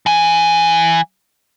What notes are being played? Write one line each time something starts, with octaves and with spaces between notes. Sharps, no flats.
E3 G#5